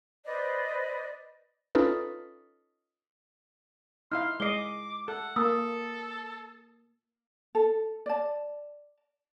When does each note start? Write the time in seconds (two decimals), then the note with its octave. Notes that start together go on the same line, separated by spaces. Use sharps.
0.25 B4 C5 D5 D#5
1.75 C#4 D#4 F4 A4 B4
4.12 D#4 E4 F5 C6 F6
4.40 G#3 D#5 D6 C7 G7
5.08 A4 F#5
5.36 A#3 A4 D#6 E6
7.55 A4
8.06 D5 A5